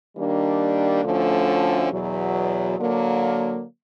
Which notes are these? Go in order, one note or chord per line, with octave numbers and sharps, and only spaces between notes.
D#3 G3 A#3 D4
D2 D3 F3 A3 C#4
E2 B2 F#3
D3 F#3 A#3